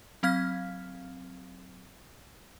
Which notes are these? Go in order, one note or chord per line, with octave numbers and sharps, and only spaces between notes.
F#3 C4 F5 F6 G#6 B6